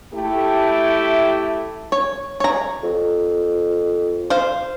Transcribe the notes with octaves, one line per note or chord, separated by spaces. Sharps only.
A3 E4 G4
C#5
C#5 A#5
F2
C5 F5